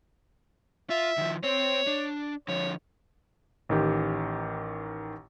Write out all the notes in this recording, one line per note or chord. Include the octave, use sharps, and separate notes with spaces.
F4 E5
D#3 F3
C4 C5 C#5
D4
D3 F3 C#5
A1 D#3 G4